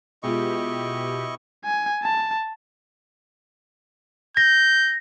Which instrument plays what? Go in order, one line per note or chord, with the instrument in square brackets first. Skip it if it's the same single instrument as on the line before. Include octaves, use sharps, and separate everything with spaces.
[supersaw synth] B2 G4 [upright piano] G#3 F4 [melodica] E4 D#5 C#6
[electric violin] G#5
A5
[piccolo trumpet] G6 [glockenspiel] A#6